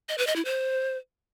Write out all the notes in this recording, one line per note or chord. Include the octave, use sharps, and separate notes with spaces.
D#5
B4
D#5
E4
C5